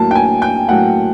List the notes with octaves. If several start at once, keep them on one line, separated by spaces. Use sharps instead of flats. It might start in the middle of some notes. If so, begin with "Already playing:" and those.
Already playing: A2 F#3 A#3 A5
G5
G#5
G5
A2 F#3 A#3 F#5